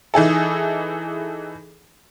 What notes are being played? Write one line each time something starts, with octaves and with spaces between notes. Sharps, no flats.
E3 D#4 G#4 A4